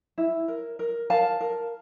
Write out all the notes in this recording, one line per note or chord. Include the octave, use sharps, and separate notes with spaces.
E4
A#4
A#4
A#4 F5 A5
A#4